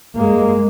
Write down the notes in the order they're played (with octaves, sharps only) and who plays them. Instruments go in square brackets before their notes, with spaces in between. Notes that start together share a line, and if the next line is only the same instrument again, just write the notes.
[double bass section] G2 G#3 A#3